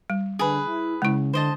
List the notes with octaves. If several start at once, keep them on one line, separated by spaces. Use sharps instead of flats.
G3
D3 G#4 B4
E4
C#3 G#3 E4
D3 C5 D#5 A5